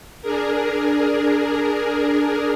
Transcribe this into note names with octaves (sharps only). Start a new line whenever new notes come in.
D4 G#4 A#4